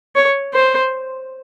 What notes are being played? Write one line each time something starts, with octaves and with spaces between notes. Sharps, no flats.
C#5
C5